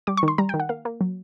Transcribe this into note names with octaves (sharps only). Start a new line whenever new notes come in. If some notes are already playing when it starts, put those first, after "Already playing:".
G3 D6
C#6
D#3 C6
G3 A#5
G5
D#3
F#5
A#3 F5
A#3
F#3